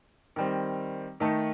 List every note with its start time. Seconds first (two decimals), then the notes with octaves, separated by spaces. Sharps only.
0.36 D#3 G3 C4
1.20 D#3 A3 D#4 A4